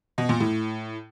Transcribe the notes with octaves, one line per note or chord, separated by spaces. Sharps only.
B2
A#2
A2